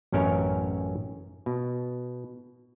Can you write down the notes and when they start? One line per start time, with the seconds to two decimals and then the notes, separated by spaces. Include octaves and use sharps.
0.12 A1 F#2 C#4 A#4 C#5
1.46 B2